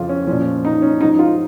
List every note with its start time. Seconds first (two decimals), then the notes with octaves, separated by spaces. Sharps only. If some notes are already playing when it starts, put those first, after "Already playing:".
Already playing: F2 C#3 F3 F4
0.09 C#4
0.27 A#2 F3 C#4
0.65 D#4
0.82 C#4
1.01 G#2 F3 D#4
1.19 F4